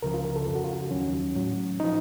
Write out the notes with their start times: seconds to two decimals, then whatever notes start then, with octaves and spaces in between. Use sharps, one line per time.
0.02 C#2 C#3 F3 A#4
0.14 F4
0.25 A#4
0.36 A4
0.47 F2 C#3 F3 A4
0.55 F#4
0.64 F4
0.73 F#4
0.91 D#2 D#3 F#3 C#4
1.35 A2 F#3
1.80 F3 D#4